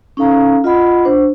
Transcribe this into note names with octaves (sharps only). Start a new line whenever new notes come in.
C#4 D#4 A4 F5 A#5
F4 D#5 F#5 B5
D4 C5